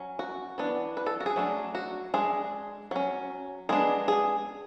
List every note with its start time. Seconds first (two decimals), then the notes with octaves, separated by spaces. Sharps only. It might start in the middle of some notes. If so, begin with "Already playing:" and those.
Already playing: F#3 C#4
0.19 F#4
0.58 E3 B3 D4
0.97 B4
1.06 A4
1.20 F#4
1.26 G#4
1.36 F#3 A3 D4
1.75 F#4
2.14 G#3 D4 G#4
2.91 F#3 C#4
3.69 G#3 B3 D4 G#4
4.08 G#4